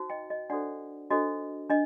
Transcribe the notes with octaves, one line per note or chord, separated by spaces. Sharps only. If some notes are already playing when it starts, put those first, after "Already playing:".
Already playing: D#4 F#4 C5
D#5 G5
D#5
D4 F#4 A4 C5 D5 F#5
D4 F#4 A4 C5 D#5
D4 D#5